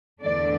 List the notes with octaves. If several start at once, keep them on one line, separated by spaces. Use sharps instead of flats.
E2 D3 A3 D4 D5